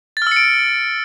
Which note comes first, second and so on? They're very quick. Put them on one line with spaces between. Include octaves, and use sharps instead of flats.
A6 F6 E6 C#7 D7